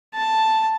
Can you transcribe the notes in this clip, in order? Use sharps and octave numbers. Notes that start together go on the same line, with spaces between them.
A5